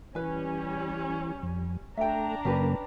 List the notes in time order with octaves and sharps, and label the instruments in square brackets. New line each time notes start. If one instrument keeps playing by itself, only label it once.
[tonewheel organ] E3 [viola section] G3 C#4 [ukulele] B4 G#5
[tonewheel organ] F2
[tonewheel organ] A3 [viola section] D4 A#5 [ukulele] E5 G5
[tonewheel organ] F#2 C#3 A#3 [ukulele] C#4 G4 B4